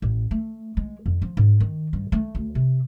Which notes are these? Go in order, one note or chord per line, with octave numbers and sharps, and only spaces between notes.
A1
A3
G#3
F2
F3
G#2
D#3
G2
A3
D2
C3